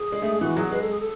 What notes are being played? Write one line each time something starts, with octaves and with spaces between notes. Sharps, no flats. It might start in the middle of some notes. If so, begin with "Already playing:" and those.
Already playing: G#4
G#3
A3
G#3
E3 F#4
F#3 G#4
G#3 B4
A4
G#4
A4